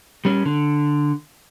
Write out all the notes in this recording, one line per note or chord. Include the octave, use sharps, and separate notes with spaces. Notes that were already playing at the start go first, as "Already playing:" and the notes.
G3 C#4
D3